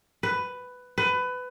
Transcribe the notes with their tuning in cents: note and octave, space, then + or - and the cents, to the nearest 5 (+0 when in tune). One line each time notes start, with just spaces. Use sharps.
B4 +10
B4 +20